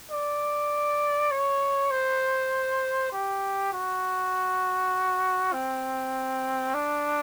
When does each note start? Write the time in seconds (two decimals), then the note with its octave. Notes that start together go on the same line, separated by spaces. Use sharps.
0.11 D5
1.31 C#5
1.91 C5
3.12 G4
3.72 F#4
5.53 C4
6.74 D4